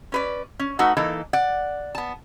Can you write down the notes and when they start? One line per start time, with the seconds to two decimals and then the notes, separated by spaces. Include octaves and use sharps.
0.12 C#4 B4 D5
0.59 C#4
0.79 A3 D#4 F#4 B4 F#5
0.97 E3 A#3 D#4 A4
1.33 D5 F#5
1.95 B3 A5